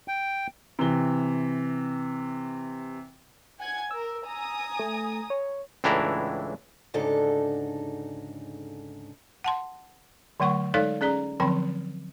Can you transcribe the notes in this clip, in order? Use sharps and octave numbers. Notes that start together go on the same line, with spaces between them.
G5
C3 E3 G7
F#5 G#5 G#6
A#4 E6
G#5 A#5 D#6
A3
C#5
C#2 A2 E3 D4 E4 A#5
D2 G#2 C#3 D4 D#4 A4
F#5 A5 C6
D3 F#3 A3 F#5 C#6
G#3 D#4 A4 C#5 D5 F5
C#4 G#4 D5 A#5
D3 F3 F#3 C4 G5 B5